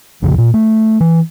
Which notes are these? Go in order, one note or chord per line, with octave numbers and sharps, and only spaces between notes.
B1 F2 C#3 F3
A#2
A3
E3